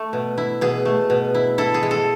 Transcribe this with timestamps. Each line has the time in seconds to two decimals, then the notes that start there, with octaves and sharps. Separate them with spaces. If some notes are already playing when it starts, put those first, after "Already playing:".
Already playing: A3
0.13 B2
0.38 E4
0.61 B2 G#4
0.85 A3
1.10 B2
1.35 E4
1.58 E4 A4
1.74 G#4
1.83 G#3
1.91 A4